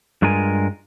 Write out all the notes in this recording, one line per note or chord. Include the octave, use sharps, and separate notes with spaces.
G2 G#3 F4 A#4 G#5